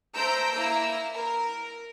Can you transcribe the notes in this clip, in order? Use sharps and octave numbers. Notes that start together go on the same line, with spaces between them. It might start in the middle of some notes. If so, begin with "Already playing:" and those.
A3 C5 A#5 E6 G6 D7
A#3 E4 A#5 E6
A#4